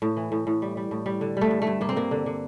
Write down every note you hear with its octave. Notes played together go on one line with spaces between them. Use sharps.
A2
E3
A2
A2
G3
G3
A2
G3
D3
G3 A3
G2
A3
G2
G2 A#3
C4
G2 A#3
D3
D3